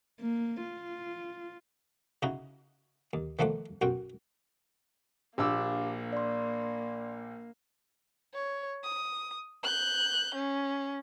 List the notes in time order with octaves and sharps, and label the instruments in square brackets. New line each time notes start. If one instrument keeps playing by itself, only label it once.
[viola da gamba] A#3
F4
[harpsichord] C#3 D#4 E4 F#4
D#2
D#3 F3 A3 F#5 D6
B1 F#2 F#4 G5
[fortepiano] A#1 D4 E6 [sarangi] A#3 [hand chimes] G4 F5 D6
[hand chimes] D5 C6
[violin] C#5
D#6
F#6 G6
C#4